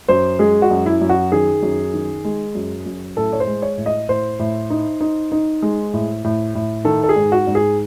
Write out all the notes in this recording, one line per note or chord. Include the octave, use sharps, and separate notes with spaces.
F#2 C5
G#3 G#4
F#4
F#2
E4
F#2
F#4
D#3 G#4
F#2
D#3
G#3
F#2
F#2
A2 A4
C#5
C5
G#3
C#5
A2
D#5
A2 C5
A2
D#4
D#4
D#4
G#3
A2
A2
A2
D#3 A4
A4
G#4
G#2
F#4
G#2
G#4